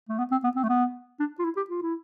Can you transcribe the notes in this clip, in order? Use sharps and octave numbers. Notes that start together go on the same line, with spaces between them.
A3
B3
C4
B3
C4
A3
B3
D4
F4
E4
G4
F4
E4